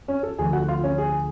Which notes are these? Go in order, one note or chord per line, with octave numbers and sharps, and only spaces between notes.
C#4 C#5
A4
D2 D3 F3 G#4 G#5
F#4 F#5
F4 F5
C#4 C#5
G#4